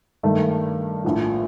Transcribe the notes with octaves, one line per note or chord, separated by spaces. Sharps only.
G2 D#3 A3
A#1 A2 F3